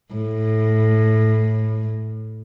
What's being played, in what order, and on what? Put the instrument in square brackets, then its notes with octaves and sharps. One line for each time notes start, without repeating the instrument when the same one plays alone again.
[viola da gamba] A2